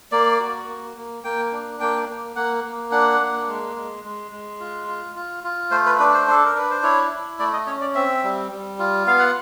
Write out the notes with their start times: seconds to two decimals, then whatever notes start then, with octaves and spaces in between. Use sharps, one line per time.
0.12 A#3 D5
0.40 F#4
0.68 A#3
0.97 A#3
1.24 A#3 G5
1.52 D4
1.80 A#3 G5
2.09 A#3
2.36 A#3 F#5
2.64 A#3
2.91 D4 F#5
3.20 A#3
3.48 G#3
3.76 G#3
4.04 G#3
4.32 G#3
4.60 F4
4.88 F4
5.16 F4
5.44 F4
5.71 A3 C5
5.86 B4
5.99 D4 B4
6.14 C5
6.28 D4 A4
6.45 A#4
6.55 D4 B4
6.71 C5
6.83 E4 C#5
7.11 E4
7.39 A3 D5
7.53 D#5
7.67 C#4 C#5
7.81 D5
7.95 C4 E5
8.24 G3
8.51 G3
8.79 F4
9.07 B3 F5
9.19 F#5